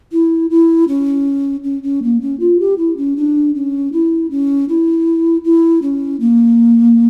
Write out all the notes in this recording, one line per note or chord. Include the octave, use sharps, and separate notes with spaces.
E4
E4
C#4
C#4
C#4
A#3
C#4
F4
G4
E4
C#4
D4
C#4
E4
C#4
E4
E4
C#4
A#3